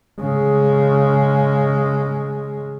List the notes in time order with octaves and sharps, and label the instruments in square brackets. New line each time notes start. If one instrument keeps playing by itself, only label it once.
[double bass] C#3 G#3